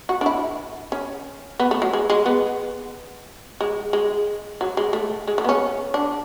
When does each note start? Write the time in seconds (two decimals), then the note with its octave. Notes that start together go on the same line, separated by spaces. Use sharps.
0.09 F#4
0.21 D4
0.26 E4
0.92 C#4
1.60 B3
1.71 A3
1.82 F#3
1.93 G#3
2.10 G#3
2.26 B3
3.61 G#3
3.93 G#3
4.61 F#3
4.77 G#3
4.93 A3
5.27 G#3
5.38 A3
5.44 B3
5.49 C#4
5.94 D4